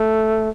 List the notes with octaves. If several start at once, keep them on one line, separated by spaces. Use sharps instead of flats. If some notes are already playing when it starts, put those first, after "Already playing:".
Already playing: A3